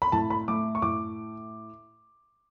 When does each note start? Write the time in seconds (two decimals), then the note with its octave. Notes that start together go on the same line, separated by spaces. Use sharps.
0.02 B5
0.12 A2 A5
0.30 B5
0.48 A3 D6
0.75 C#6
0.82 A2 D6